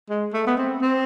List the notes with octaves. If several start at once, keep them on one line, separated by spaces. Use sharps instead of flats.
G#3
A3
B3
C4
C4